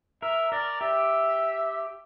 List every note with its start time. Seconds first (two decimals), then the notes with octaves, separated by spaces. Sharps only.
0.22 A#4 E5
0.52 A#4 D5
0.81 G4 E5